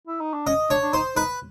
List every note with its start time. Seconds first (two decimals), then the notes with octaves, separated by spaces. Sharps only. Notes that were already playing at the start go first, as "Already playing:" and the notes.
0.08 E4
0.20 D#4
0.33 D4
0.47 C#4 D#5
0.70 D4 C#5
0.82 D4
0.93 D#4 C5
1.16 D#4 B4